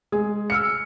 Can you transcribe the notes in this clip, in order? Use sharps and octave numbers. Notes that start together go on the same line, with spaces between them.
G#3 G#4
E6 F6 C#7